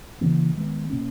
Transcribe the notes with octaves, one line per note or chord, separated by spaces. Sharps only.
C#3 E3 A#3
D#3 G#3 B3
B2 A#3 C#4